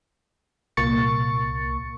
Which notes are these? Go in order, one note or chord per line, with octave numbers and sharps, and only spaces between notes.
C2 A#2 A#3 C#6 A6 C#7